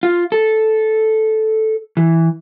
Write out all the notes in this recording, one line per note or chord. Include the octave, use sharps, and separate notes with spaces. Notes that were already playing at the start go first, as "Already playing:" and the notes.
F4
A4
E3